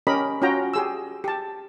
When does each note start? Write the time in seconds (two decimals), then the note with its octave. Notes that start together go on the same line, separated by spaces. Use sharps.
0.07 C#4 G4 A#4 D#5 B5
0.42 C#4 F4 F#4 G5 A#5
0.74 G4 G#4 E6
1.24 G4 A5